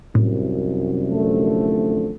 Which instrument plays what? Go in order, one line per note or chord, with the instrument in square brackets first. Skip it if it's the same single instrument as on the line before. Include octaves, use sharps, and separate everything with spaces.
[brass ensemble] C2 F#2 [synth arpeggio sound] A2
[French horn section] D3 F3 A3